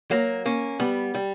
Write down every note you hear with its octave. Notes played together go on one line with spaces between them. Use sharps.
F#3 A#3
A#3 C#4
G3 B3
G3